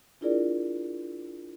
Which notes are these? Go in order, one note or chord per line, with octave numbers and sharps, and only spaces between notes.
D4 E4 F4 G#4 A#4 D5